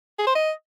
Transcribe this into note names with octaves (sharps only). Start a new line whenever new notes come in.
G#4
C5
D#5